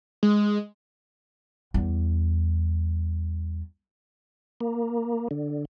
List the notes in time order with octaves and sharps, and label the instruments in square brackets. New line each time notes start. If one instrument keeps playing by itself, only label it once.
[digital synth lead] G#3
[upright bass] E2 G3
[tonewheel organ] A#3
D3